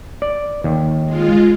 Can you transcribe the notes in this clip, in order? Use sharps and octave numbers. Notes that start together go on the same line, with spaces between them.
D5
D#2
G#3 F4